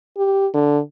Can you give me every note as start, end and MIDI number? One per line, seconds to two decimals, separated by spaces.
0.17 0.47 67
0.54 0.80 50